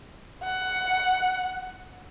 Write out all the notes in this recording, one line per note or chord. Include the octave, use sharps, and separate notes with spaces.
F#5